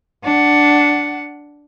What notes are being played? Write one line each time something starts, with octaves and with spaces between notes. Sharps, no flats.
D4 F#5